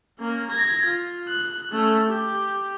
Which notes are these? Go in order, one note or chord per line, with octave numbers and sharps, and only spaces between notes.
A#3 C#4
G#6 A#6
F4
F#6
A3 C#4
G4